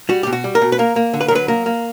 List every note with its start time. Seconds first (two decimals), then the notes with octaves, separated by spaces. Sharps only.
0.09 G3 F#4
0.23 B2 G4
0.33 F#4
0.44 G3
0.55 A#4
0.62 B2
0.72 B4
0.79 A#3 A#4
0.96 A#3
1.14 D3
1.21 B4
1.28 A#4
1.31 F#3 B4
1.48 A#3 A#4
1.66 A#3